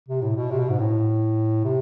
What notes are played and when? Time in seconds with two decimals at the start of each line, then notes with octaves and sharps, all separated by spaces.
0.09 C3
0.22 A2
0.36 B2
0.51 C3
0.59 B2
0.70 G#2
0.79 A2
1.64 C3